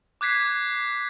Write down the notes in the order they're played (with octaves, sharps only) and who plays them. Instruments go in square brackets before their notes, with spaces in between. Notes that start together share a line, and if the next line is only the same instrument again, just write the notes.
[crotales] D6 F#6 G#6 B6 C7